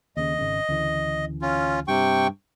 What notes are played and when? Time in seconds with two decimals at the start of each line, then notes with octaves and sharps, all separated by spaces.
0.17 D#2 C#3 D#5
0.38 G#1 C#3
0.69 D2 C#3 E3
1.42 C#4 F4
1.88 G2 C3 G5 C#6